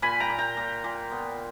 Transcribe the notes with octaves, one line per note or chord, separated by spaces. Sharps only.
A#2 G#5 B5
G5 A#5
A#2
G5 A#5
A#2
A#2
B3